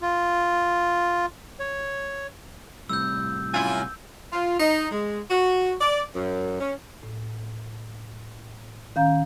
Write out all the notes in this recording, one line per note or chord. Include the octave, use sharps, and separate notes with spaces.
F4
C#5
A2 C3 G3 E6 G6
F#2 E4 F4 G#5
F4
D#4
G#3
F#4
D5
F#2
C#4
A2
D#3 C#4 F5 A#5 G6